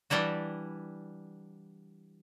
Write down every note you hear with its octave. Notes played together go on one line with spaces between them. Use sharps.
E3 G3 D4 E4 F#4